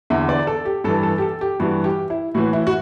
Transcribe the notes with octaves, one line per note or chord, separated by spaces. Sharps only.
E2 D3 E5
D5
A4
G4
G2 E3 A4
A4
G4
A4
G4
G2 E3 F#4
G4
E4
A2 E3 F#4
E4
F#4